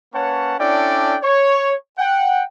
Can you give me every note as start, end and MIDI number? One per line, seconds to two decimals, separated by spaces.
0.14 0.55 58
0.14 0.55 61
0.14 0.55 71
0.14 0.55 73
0.14 0.55 78
0.14 0.55 81
0.59 1.16 61
0.59 1.16 62
0.59 1.16 64
0.59 1.16 69
0.59 1.16 74
0.59 1.16 79
1.23 1.74 73
1.98 2.43 78
1.98 2.43 79